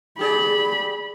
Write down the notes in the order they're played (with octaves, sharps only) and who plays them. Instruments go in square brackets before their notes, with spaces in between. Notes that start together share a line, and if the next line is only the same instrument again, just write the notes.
[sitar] G4 G#4 D5 [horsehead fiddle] B5